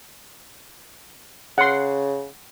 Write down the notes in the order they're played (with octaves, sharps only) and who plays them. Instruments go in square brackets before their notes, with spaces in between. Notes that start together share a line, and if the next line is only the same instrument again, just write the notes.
[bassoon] C#3 [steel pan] F#5 C6